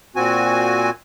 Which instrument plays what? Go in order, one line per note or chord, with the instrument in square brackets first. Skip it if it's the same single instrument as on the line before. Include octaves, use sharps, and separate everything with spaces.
[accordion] A#2 C4 F#4 G#5